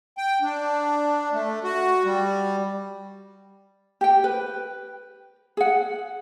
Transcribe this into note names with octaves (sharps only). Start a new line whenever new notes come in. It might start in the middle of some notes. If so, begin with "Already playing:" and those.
G5
D4
A3
F#4
G3
G4 G5
B4
G#4 F#5